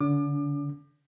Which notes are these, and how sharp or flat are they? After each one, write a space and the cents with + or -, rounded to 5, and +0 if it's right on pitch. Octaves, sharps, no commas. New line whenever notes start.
D3 -25 D4 -40 D6 +35